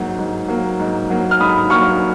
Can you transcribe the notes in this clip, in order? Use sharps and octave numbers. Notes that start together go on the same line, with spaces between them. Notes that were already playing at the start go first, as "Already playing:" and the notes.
Already playing: G#2 F#3 A#3
G#2
F#3 A#3
G#2
F#3 A#3
F6
G#2 B5 D#6
F#3 A#3 C#6 F6